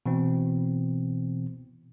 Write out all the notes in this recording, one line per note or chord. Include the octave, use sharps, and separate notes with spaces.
B2 E3 C4